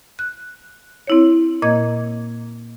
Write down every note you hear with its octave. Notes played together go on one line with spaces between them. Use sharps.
F#6
C4 E4 C#5
A#2 A#3 D#5 G#6